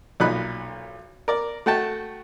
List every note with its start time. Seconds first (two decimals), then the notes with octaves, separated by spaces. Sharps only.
0.20 B1 A#2 D#4 B5 F#6
1.28 A#4 D5
1.66 A3 F#4 G5 A5